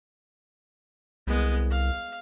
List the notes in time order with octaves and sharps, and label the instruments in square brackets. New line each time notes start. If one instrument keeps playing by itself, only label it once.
[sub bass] C2 [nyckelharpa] G#3 B3
[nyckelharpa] F5